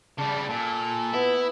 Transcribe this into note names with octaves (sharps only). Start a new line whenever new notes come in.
C#3 G3 D5 A5
A#2 A4
B3 E4